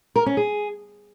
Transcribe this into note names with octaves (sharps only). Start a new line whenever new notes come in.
A#4
C#4
G#4